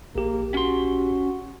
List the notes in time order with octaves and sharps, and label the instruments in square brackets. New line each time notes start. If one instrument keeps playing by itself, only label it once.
[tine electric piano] A#1 G4 [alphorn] A#3
[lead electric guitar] C#4 C6 [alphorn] F#4